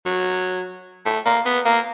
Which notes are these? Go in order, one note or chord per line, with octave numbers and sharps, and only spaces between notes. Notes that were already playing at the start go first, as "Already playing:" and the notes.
F#3
A3
A#3
B3
A#3